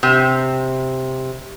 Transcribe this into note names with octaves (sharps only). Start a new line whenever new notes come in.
C3